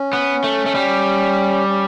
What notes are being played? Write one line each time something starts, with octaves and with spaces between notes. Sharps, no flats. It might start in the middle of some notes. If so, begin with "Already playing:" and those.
Already playing: C#4
B3
A3
A3
G3
C#4